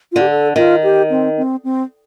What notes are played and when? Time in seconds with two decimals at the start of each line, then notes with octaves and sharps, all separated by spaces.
0.12 F4
0.16 D3
0.21 G4
0.29 A4
0.56 D#3 F4
0.83 G4
1.10 C4
1.37 C4
1.64 C4